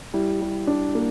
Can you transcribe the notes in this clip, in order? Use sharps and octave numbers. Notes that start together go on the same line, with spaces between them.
G3 E4
G3
D4
A#3